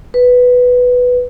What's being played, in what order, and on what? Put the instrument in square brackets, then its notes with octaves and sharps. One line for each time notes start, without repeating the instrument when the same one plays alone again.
[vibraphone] B4